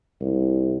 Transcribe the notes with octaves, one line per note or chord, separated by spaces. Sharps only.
C2